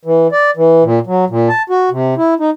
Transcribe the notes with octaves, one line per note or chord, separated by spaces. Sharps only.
E3
D5
E3
A#2
F#3
A#2
A5
F#4
C3
E4
D#4